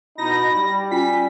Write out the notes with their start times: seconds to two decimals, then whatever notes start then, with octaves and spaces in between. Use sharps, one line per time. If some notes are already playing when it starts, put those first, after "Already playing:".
0.18 B2 D#4 E4 B5 A#6
0.54 G3
0.91 C#4 F4 G5 G#5 B6